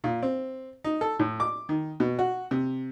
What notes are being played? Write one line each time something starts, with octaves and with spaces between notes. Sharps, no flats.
A#2
C4
D#4
A4
A2
D6
D#3
B2
F#4
C3